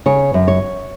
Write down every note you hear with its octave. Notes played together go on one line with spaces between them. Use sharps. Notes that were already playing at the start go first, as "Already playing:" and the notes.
C#3 C#5
F#2
C#5